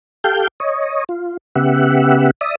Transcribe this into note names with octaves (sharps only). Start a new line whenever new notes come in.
G4 A4 F5 G5 G6
C#5 D#5
F4
C#3 B3 G4 E5 F#5
D5 E5 D#6